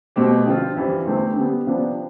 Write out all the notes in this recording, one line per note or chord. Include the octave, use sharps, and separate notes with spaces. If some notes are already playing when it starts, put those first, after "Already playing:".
B2 A3 C4 G4
D3 F3 C4 F4
F2 E3 G3
E2 D3 A3 C4
D3 G3 B3
C3 F3 B3 D4